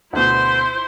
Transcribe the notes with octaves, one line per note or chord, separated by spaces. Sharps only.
D2 B2 E4 C5